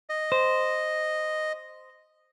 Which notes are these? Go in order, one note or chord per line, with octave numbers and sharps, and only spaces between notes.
D#5
C5